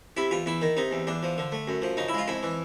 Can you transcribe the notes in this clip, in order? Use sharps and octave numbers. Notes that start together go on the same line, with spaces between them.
C3 E4
E2 F4
E2 E4
D#3
C3 D#4
E2
E2 D4
F3
D3
A3
F#2
F3
C#3 D#4
E4
G#3 F4
F2 E4
E3